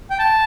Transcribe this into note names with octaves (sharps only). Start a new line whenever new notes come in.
G5
A5